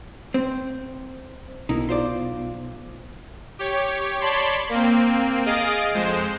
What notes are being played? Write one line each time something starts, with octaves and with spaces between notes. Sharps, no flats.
C4 C5
B1 D#4 E4 A#4
F4 C5 D5
G4 C#5
C#5 D5 A5 B5 C6
A#3 C4
G#4 D#5 F5 D#6 A6 D7
F2 G#3 C5